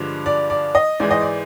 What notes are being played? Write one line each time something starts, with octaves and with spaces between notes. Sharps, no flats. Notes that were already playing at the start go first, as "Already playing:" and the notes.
Already playing: G2 D3 F3 G#3
D5
D5
D#5
G#2 E3 G#3 D5
D#5
D5